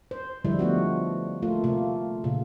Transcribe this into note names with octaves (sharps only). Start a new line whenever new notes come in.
C5
D3 F3 G3 G#3 E4
F3 A3 B3 F#4
A3 A#3 F4
C3 A3 A#3
A#2 C#3